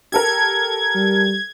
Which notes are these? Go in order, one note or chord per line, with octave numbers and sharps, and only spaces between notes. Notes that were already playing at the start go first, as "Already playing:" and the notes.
G4 A4 A#4 G#6
G3